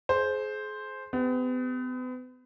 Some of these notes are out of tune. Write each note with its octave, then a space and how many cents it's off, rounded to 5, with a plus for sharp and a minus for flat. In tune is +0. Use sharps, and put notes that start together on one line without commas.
G#4 +35 C5 +0
B3 +40 G4 +35